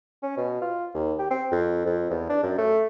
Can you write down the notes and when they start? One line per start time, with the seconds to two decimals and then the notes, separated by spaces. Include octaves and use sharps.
0.23 C#4
0.37 B2
0.62 F4
0.94 D#2
1.19 G4
1.31 C4
1.52 F2
1.86 F2
2.10 E2
2.30 D4
2.43 F#2
2.58 A3